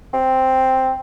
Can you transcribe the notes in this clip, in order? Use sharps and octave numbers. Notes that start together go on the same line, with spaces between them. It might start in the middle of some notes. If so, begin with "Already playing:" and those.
C4